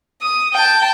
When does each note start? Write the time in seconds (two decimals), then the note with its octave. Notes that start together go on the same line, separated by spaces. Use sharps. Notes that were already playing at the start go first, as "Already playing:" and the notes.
0.21 D#6
0.53 G5 A5